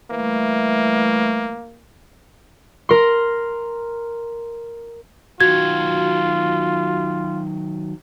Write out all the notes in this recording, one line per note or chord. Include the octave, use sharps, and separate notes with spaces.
E3 G3 A3 A#3
A#4 C6
D#3 F#3 F4 F#4 G#6